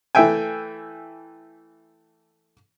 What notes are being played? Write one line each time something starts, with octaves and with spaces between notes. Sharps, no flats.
E3 A3 E5 G5 G#5